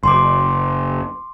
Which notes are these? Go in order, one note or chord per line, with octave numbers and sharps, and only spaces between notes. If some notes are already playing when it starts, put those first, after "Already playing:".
F#1 C6 D6